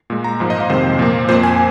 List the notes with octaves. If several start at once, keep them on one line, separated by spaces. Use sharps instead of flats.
A#2 G#3
A#5
G#2 F3 A#3
D#5
F5
F2 C3 D#3 G#3 C5
A#2 F3 A#3
F2 F3 A#3 C5
G#5